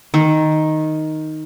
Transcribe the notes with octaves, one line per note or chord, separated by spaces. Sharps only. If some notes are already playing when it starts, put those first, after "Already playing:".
D#3